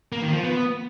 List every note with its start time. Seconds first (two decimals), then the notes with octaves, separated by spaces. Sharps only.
0.12 A#3
0.23 D#3
0.33 F3
0.43 B3